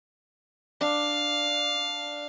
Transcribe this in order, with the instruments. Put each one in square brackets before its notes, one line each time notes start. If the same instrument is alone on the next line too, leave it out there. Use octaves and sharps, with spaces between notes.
[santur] D4 [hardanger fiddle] F5